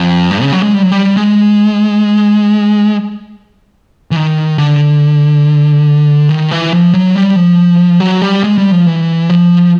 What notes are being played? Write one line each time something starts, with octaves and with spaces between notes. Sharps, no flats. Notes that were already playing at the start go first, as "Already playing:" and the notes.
Already playing: F2
G2
C#3
F#3
G#3
G3
F#3
G3
G#3
E3
D#3
D3
D#3
E3
F3
F#3
G3
F3
F#3
G3
G#3
G3
F3
E3
F3